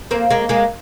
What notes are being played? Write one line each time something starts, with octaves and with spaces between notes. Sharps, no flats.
A#3 C4
G#3 A#3
G#3 A#3